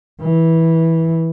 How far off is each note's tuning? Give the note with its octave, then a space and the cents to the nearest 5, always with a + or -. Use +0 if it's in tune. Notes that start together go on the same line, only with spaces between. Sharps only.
E3 -15